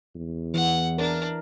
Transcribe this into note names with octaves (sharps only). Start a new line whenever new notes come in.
E2
E3 F#5
D4 A#4